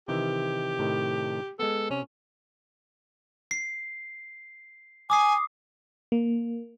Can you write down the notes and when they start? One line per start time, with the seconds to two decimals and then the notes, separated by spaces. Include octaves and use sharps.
0.08 C3 D#3 E3 G4
0.79 A2 C3 D#3
1.59 G#3 B3 A4
1.90 C3 C#4
3.51 C7
5.10 G#5 D6 D#6 C7
6.12 A#3